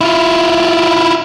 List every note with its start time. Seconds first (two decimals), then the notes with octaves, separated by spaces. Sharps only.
0.01 E4 F4